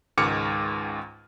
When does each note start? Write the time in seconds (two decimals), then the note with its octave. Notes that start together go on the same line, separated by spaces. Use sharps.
0.18 C#2 G#2 D#3 D6 F6 C#7